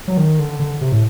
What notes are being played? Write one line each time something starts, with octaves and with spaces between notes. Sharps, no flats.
F#3
D#3
D3
D3
C3
A2